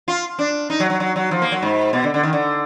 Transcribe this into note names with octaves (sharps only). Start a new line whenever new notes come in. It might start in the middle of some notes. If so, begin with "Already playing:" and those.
F4
D4
D#4
F#3
F#3
F#3
F#3
F3
A#3
F#3
G#2
B2
D3
D3
D#3
D3